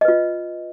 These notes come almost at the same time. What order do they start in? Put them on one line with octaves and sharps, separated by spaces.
D#5 B4 F4